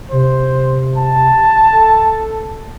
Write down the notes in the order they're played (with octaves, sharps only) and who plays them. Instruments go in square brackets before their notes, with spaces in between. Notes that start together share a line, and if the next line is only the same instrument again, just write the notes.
[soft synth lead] C3 [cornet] C5
[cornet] A5
[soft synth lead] A4